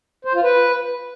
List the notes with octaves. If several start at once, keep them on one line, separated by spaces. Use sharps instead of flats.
C5
F4
B4